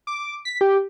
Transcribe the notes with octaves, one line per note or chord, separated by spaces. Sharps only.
D6
B6
G4